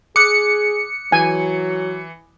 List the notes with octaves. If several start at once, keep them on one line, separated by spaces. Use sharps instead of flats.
G#4 D6 D#6 F#6 C#7
E3 F#3 G#5